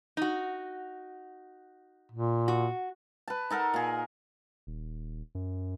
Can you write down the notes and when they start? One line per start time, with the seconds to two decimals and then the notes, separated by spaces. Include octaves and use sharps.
0.17 D#4 F#4
2.12 A#2
2.48 F#4
3.28 B4 A5
3.50 D#4 A4 A#4 F#5
3.74 A#2 G#4
4.67 D#1
5.35 F#2